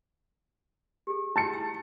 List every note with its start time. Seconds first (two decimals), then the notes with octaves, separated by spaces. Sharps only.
1.07 G4 G#4
1.36 E4 F#4 A5 A6 C#7
1.54 E4 G#5 E6